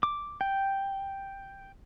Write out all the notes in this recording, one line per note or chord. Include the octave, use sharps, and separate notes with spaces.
D6
G5